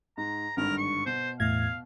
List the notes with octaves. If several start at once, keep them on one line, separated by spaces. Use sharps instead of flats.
G#2 A#5
G#1 G2 D3 A#4
C#6
B2 C5
E2 A2 F5 G#6